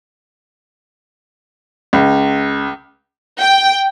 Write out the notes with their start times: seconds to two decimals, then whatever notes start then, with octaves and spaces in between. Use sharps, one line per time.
1.93 C#2
3.40 G5